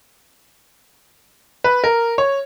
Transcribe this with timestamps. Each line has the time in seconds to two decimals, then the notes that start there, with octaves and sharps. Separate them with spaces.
1.64 B4
1.84 A#4
2.18 C#5